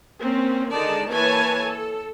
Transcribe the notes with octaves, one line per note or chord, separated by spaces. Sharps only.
A#3 C4 C#4
D3 D#3 G#3 D#4 D5 A5
E3 A#3 B4 C#5 G#5 A5
A4